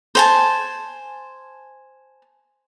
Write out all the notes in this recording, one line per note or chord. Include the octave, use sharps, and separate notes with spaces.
C5 G#5 A5